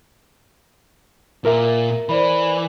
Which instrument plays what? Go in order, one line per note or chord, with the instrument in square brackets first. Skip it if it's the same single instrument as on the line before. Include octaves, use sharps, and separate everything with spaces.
[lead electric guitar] A#2 A#3 [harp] A#4 E5
[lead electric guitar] E3 [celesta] C5 D5 B5